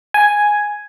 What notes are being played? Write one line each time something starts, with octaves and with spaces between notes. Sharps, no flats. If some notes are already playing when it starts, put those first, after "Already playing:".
G#5